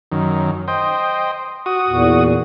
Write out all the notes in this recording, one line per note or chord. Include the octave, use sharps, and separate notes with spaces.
F#2 D#3
C5 D#5 G5
F#4 D#6
E2 A#2